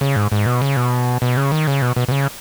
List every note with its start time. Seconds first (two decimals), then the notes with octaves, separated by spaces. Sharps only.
0.01 C#3
0.16 G#2
0.32 G#2
0.46 B2
0.62 C#3
0.77 B2
1.22 B2
1.37 C#3
1.52 D#3
1.67 C#3
1.82 B2
1.96 B2
2.08 B2
2.12 C#3